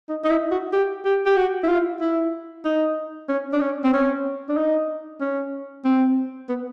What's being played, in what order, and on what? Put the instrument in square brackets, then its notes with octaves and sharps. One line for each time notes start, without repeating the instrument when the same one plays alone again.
[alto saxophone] D#4
D#4
E4
F#4
G4
G4
G4
F#4
E4
F4
E4
D#4
C#4
D4
C#4
C4
C#4
D4
D#4
C#4
C4
B3